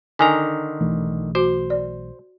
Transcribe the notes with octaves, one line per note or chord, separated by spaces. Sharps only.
D3 D#3 G#5 A#5
B1 E3 A3
F#4 C5
D5